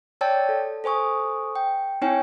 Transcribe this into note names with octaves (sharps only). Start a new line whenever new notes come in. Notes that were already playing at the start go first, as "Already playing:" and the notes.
C#5 D5 G5 A5 E6 A6
A4
A4 C5 G#5 C#6 D#6
G5
C4 D#4 E4 C#5 G5 G#5